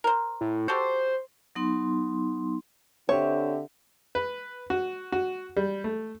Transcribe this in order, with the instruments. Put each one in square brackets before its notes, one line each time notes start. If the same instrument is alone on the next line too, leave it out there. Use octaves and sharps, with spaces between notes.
[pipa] A#4 C5
[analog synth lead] A2
[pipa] F#4 G4 A4 [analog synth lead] C5
[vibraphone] F#3 B3 D#4 C6
[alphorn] D3 [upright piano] C4 G4 [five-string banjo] C#5 [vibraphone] E5
[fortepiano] B4
F#4
F#4
G3
A3